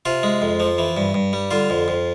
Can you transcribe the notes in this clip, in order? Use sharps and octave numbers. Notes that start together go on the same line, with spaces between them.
C3 F4
G#3
F2
F3
E3
G2
G2
G3
D3 F4
F2
F2